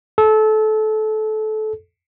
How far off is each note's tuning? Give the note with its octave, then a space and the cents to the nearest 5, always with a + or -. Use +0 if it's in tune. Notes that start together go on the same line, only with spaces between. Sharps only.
A4 -25